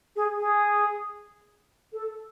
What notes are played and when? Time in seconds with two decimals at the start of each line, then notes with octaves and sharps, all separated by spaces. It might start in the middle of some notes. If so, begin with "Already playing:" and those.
0.16 G#4
0.38 G#4
1.93 A4